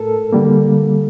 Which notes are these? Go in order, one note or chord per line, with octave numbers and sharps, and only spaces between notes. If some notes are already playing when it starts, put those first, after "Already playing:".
Already playing: A2 A3 A4 A#4
D3 G3 A#3